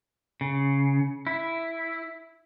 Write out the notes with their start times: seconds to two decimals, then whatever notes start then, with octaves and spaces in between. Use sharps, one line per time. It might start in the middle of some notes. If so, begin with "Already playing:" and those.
0.41 C#3
1.27 E4